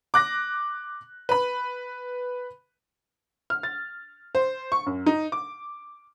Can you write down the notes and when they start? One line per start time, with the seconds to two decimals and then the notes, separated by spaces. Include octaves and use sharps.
0.14 D6 F#6 A#6
1.29 B4 B5
3.50 F6
3.63 A6
4.35 C5
4.72 C#6
4.86 F#2
5.06 D#4
5.32 D6